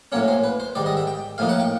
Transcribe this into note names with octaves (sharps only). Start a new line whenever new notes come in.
A2 F#3 A#3 C#4 C#5
C5
B4
C5
G#2 D#3 G3 D5
D#5
E5
G5
A2 F3 A#3 D#4 F5
F#5
G5